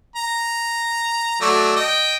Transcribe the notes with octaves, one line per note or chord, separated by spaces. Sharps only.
A#5
F#3 A3 D5
D#5 G5